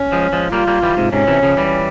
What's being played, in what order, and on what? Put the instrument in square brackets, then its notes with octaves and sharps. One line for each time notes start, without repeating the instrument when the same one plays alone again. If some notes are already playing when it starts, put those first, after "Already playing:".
Already playing: [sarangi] C#4
[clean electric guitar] F3 G#3
F3 G#3
[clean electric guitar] G3 A#3 [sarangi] F4
[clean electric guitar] G3 A#3
E3 G3
G#2 C3
[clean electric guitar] G#2 C3 [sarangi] C#4
[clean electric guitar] C3 E3
C#3 F3
E3 G3